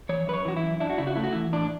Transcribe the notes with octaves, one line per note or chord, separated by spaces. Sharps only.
E3 C#5
F#2 B4
C#5
E3 F#4
E4
F#2
D4 E4
F#4
C#3 E4
F#4
A3 E4
F#4
E3 E4
A2 D4